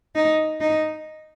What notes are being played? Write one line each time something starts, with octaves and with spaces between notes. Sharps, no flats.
D#4
D#4